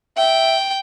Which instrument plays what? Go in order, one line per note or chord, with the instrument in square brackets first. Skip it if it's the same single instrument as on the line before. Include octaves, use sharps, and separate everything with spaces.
[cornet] E5 [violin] G5